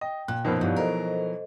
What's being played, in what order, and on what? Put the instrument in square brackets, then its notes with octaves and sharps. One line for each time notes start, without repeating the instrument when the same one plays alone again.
[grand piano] D#5 [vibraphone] G5
[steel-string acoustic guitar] A#2 [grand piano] F#6
[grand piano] F#2 B2 [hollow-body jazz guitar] F3 B3 D#4 [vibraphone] A#4 C5 B5
[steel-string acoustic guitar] G2 [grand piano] B2 E3 F#3 [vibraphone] G4 D5 F5
[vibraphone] A4 C5 D#5 [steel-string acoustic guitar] A#4